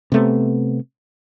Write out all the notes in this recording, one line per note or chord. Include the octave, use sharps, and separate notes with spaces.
C3 A3 B3